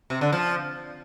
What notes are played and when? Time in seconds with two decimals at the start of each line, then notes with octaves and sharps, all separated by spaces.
0.10 C3
0.21 D3
0.32 F3